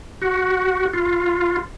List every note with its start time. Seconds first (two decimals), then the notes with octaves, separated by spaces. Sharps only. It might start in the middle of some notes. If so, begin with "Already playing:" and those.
0.22 F#4
0.93 F4